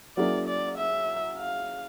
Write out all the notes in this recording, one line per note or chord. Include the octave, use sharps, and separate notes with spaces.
F#3 A#3 C#4 E4 G#4 D5
D5
E5
F5